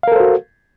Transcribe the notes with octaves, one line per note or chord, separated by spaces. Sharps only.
F#4 A4 A#4 C5 F5